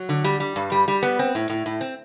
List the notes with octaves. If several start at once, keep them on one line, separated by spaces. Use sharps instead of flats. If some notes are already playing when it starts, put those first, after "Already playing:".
Already playing: F#3
D3
G3
G3
G2
G3
G3
B3
C4
A2
A2
A2
C4